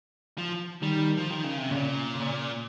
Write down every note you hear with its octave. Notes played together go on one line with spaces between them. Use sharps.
F3
D#3 G3
F3
D#3
C#3
C3
A#2 C#3
C#3